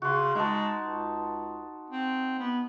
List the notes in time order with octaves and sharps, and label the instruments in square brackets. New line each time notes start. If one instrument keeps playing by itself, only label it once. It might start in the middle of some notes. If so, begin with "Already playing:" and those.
[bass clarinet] C#3 [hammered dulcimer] F#4 C6
[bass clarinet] G#3 [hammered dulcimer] D#4 F#4 A5
[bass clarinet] C#2
C4
B3